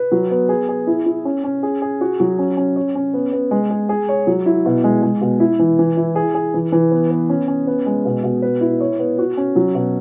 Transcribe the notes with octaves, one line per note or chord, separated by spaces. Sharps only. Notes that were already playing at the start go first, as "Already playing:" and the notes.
Already playing: B4
F#3
B3
G#4
G#4
E4
E4
C#4
C#4
G#4
G#4
F#4
F#3
C#4
C#4
C#5
C#4
B3
B3
G#3
G#4
G#4
C#5
F#3
E4
B2
G#3
G#3
B2
E4
E3
E3
E4
G#4
G#4
E3
E3
B3
B3
C#4
C#4
B3
G#3
B2
B2
B4
E4
C#5
B3
F#4
C#4
F#3
B2